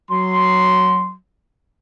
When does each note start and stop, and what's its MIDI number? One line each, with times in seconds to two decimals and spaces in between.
0.11 1.12 54
0.11 1.12 84